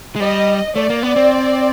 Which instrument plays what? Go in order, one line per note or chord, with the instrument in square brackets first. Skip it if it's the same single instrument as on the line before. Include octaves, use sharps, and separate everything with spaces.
[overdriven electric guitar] G#3
[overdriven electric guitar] G3 [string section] D#5
[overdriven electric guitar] A3 [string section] D5
[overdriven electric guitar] A#3
B3
C4